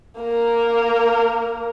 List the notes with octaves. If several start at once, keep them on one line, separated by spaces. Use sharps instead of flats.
A#3 A#4